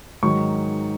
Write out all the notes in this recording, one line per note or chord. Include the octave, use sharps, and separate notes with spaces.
G#2 D#3 F#3 C#6